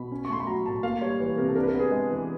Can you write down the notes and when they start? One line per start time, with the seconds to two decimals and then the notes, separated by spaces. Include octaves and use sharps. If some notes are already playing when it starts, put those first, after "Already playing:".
Already playing: B2 B5
0.12 C#4
0.25 C#6
0.30 A3 C6
0.40 B5
0.47 F#3 A#5
0.66 A2 A5
0.83 A#3 F5
1.02 G3 C#5
1.20 E3
1.37 C3 A#4
1.48 A4
1.55 D4 A#4
1.63 B4
1.68 A#4
1.74 B3
1.80 G#4
1.92 G#3
2.10 E3